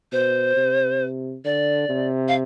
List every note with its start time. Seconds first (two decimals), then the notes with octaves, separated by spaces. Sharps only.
0.12 B2 C5
0.56 C3
1.45 D3 D5
1.89 C3
2.28 F5